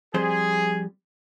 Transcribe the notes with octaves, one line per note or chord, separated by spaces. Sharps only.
F2 G3 G#4 C5